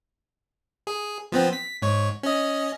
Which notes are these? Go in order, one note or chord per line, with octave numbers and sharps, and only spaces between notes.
G#4
F3 B3 C4
B6
G#2 C#5
C#4 D#5